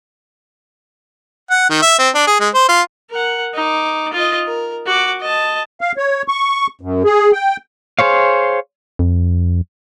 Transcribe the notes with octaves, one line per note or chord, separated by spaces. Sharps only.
F#5
D#3
E5
C4
D4
G#4
G#3
C5
F4
A#4 F#5
D#4 D6
F4 D#5
A#4
F#4 D6
D#5 A5
F5
C#5
C#6
F#2
G#4
G5
G#4 C5 C#5 F5
F2